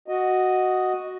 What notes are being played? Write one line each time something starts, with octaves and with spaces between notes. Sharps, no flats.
F#4 D#5